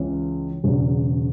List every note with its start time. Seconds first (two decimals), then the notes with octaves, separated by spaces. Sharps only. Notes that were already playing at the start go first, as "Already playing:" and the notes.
Already playing: C#2 C#3 E3
0.64 E1 E2 C#3 F#3 C#4